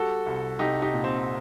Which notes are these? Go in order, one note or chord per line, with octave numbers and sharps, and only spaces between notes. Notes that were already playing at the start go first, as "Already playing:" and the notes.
Already playing: G3 F#4 A4
C2
C2 D#4 G4
D#4 G4
A#2
C4